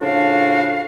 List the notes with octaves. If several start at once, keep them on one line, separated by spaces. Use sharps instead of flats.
A2 C#3 F3 D4 F#4 F5